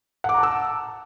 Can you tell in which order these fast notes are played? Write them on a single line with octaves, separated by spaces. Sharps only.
F#5 D6 A#5 A5 E6